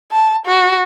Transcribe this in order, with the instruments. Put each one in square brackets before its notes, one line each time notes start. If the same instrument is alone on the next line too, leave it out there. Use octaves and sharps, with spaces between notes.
[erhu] A5
F#4